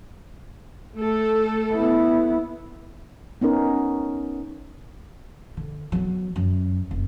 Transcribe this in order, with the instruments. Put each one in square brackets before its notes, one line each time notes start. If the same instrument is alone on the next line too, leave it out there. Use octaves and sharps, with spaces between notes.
[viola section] A3 A4
[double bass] B3 E4
[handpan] B3 C#4 D#4 A#4
[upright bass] D3
F#3 B3
F#2
F1